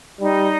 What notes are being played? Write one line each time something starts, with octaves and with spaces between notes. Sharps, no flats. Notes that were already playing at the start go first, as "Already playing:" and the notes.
G3 D#4